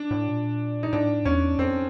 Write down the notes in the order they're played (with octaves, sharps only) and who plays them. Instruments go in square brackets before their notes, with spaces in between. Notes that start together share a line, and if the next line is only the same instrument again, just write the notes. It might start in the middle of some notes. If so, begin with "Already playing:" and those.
Already playing: [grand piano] D4
[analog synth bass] A2
A#2
[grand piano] D#4
[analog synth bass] A2 [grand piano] D4
[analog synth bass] E2 [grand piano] C#4
[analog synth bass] F2 [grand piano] C4